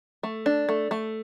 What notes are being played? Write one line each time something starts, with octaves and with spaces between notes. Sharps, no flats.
A3
D4
A3
A3